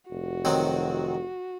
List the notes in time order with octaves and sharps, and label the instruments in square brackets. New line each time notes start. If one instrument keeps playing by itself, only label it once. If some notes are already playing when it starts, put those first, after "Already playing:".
[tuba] F1 [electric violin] F#4
[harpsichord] D#3 F#3 C4